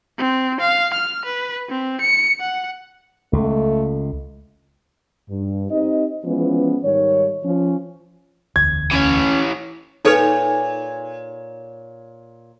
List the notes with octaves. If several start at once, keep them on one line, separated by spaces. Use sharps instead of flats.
C4
F5
F6
B4
C4
C#7
F#5
C#2 A3
G2
C4 D#4 G4 D#5
E3 F3 G#3 B3 C#4
G#2 D#3 G3 C#5
F3 C#4
E1 D2 G#6
E3 C#4 C#5
A#2 D#4 A4 B4 C#5